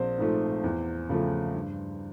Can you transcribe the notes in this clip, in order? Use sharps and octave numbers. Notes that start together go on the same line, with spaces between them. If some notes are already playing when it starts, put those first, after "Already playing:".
Already playing: A#1 C4 C5
G#2 F3 A3
E2
C#3 F3 A3
G2